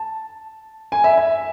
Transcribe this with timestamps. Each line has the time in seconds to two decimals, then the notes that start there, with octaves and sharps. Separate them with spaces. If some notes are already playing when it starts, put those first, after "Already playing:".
Already playing: A5
0.92 G#5
1.04 E5
1.18 E5